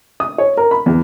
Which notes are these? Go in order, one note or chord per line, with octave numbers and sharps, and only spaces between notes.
D#6
C#5
A#4
B5
E2